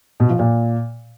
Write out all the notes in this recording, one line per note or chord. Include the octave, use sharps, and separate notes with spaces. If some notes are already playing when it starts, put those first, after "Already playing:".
B2
F3
A#2